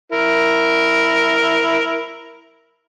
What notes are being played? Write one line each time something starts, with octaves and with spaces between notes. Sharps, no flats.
E4 A#4